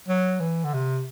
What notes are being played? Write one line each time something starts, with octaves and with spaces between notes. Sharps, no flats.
F#3
E3
D3
C3